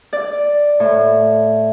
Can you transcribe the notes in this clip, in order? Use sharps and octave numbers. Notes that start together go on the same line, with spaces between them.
D5
A2